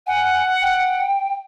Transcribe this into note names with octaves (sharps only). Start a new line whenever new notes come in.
F#5 G#5
G5